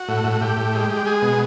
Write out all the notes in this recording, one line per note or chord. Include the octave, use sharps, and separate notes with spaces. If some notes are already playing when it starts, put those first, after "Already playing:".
Already playing: F#4
A2
A2
F#4
A2 G4
A2
G#3
G#3
G#3 G#4
B2